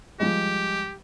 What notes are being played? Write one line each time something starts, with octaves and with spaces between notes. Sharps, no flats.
F3 G3 G#3 G4